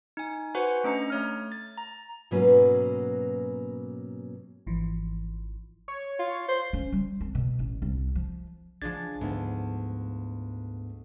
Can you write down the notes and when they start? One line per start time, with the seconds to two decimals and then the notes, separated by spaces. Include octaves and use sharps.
0.17 D#4 G#5
0.55 F#4 B4 C5 F#5 G#5
0.84 A3 C#4 D4 D#5 A#5 C#7
1.10 A3 C#5 F6
1.52 A6
1.78 A#5
2.31 G#2 B2 F#3 A#3 C#4 B4
4.67 G#1 E3 F3
5.88 C#5
6.19 F4
6.49 C5
6.73 C#4
6.92 G3
7.21 C4
7.35 B2
7.59 A1
7.82 C2
8.15 F3
8.82 A#1 F3 G#3 D4 G#6 A6
9.21 D2 G#2 B3